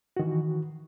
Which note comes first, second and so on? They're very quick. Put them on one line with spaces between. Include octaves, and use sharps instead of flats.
F#4 D#3 E3